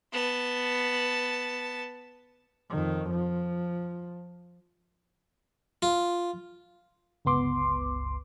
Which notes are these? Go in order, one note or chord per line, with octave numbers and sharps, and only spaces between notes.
B3 A5
F2 D#3
F3
F4
G1 C#2 B3 C6 D6